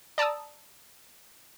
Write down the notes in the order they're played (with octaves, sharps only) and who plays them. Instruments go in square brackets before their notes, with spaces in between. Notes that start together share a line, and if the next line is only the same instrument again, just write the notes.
[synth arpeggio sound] D5 A5 A#5 D#6 E6